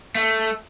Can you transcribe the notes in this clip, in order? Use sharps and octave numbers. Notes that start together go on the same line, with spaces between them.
A3